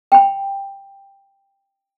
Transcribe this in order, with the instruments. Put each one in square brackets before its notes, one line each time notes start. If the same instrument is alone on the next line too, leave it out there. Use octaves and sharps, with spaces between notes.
[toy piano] G5 B5